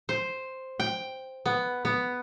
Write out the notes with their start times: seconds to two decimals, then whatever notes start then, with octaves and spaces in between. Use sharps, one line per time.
0.09 C5
0.80 G5
1.46 B3
1.85 B3